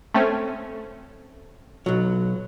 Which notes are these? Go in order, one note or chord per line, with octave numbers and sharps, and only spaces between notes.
A3 C4 C#4
B1 F#3